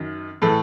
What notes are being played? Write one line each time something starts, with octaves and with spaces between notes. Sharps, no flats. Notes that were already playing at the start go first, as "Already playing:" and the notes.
Already playing: F#2 D#3
A2 E3 A4